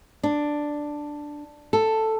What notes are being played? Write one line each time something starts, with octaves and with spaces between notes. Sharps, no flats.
D4
A4